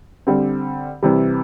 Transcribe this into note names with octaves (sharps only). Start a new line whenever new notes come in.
D3 G3 C4
C3 E3 G3